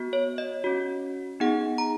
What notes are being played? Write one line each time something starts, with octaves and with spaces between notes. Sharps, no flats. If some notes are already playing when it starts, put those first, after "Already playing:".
Already playing: B3 F#4
C#5
D#5
C#4 F#4
B3 D#4 G#4 F#5
A#5